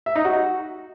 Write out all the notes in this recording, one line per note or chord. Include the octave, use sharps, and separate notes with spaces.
E5
D#4
F#4